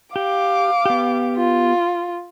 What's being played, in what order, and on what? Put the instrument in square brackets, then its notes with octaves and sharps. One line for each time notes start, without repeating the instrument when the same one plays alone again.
[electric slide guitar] G4 [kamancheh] F5 D6
[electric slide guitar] B3 G4
[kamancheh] F4